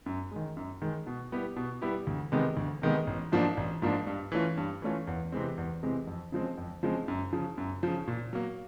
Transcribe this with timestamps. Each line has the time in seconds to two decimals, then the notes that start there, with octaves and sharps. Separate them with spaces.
0.06 F#2
0.31 D#3 G#3
0.57 F#2
0.82 D#3 G#3
1.07 B2
1.32 G3 B3 E4 G4
1.56 B2
1.81 G3 B3 E4 G4
2.07 D2
2.32 C3 D#3 G#3 B3
2.57 D2
2.82 C3 D#3 G#3 B3
3.07 A1
3.32 G#2 F3 A#3 D4
3.57 A1
3.82 G#2 F3 A#3 D4
4.07 G2
4.32 E3 A3 C#4 F4
4.57 G2
4.82 E3 A3 C#4 F4
5.07 E2
5.32 C3 E3 G#3 C4
5.58 E2
5.83 C3 E3 G#3 C4
6.07 F2
6.32 C#3 F3 G#3 C4
6.58 F2
6.83 C#3 F3 G#3 C4
7.08 F#2
7.33 C#3 F3
7.58 F#2
7.83 C#3 F3
8.07 A#2
8.33 F#3 A#3